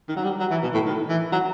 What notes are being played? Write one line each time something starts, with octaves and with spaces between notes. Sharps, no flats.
D#3
F#3
G3
F#3
E3
B2
A2
D#3
E3
F#3